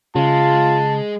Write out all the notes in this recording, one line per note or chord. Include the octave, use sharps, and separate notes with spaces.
C#3 G#3 F4 A5